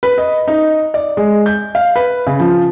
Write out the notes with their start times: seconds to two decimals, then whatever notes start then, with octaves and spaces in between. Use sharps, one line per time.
0.03 B4
0.18 D#5
0.48 D#4
0.94 D5
1.17 G#3
1.46 G6
1.75 F5
1.96 B4
2.27 C#3
2.40 F3